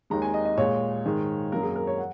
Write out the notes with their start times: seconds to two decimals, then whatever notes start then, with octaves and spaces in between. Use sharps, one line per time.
0.10 D#2 D#3 G#3 A#5
0.22 G#5
0.34 D#5
0.45 D#5
0.57 A#2 G#3 C#5
1.05 G#2 D#3 G#3
1.52 F#2 F#3 A#3 A#4
1.63 G#4
1.76 A#4
1.87 C#5
1.98 F#5